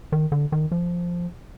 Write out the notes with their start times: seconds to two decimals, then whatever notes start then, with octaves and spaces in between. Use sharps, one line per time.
0.12 D#3
0.32 D3
0.52 D#3
0.72 F3